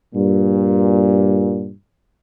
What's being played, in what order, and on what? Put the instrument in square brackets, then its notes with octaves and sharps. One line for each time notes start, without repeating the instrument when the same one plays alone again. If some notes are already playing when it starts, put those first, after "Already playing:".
[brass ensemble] G2 A#2